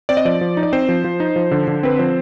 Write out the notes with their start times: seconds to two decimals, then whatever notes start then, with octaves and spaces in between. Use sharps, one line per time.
0.09 C4 D5
0.17 D#5
0.25 F3 D5
0.41 F3
0.57 D#4
0.63 D5
0.73 C4 C5
0.89 F3
1.04 F3
1.20 D#4
1.36 F3
1.51 D3
1.68 D3
1.83 C4 B4
1.99 F3 C5